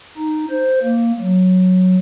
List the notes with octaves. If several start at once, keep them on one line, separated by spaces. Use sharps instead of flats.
D#4
C5
A#3
F#3